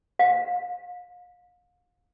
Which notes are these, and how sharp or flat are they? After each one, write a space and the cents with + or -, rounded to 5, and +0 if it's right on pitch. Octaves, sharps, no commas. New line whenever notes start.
F5 +35